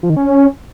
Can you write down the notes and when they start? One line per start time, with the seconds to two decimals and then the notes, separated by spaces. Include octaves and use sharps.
0.03 F3
0.10 D#3
0.16 C#4